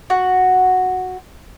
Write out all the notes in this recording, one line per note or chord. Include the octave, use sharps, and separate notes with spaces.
F#4